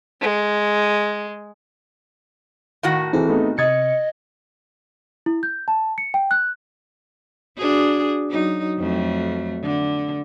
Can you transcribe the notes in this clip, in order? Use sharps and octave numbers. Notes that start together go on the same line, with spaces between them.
G#3
A2 D#3 F#4 F5
E3 C4 G#4 A4
A3 B3 D#4
C3 D#5 D#6 G#6 A6 C#7
E4
G6
A5
C#7
G5
F#6
D4 F#4 G#4
F#3 D#4
F2 F#3 A3
D3